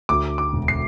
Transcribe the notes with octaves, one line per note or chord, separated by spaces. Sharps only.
D2 D6
D6
E1
C7